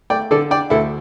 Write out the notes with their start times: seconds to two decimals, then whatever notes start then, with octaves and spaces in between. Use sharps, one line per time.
0.10 A3 D5 G5
0.31 D3 A4 D5
0.50 D4 D5 G5
0.70 D2 E4 A4